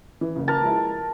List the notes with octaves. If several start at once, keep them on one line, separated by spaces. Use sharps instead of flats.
E3
F#1 C#3
A#4 A5
F3 G#3 E4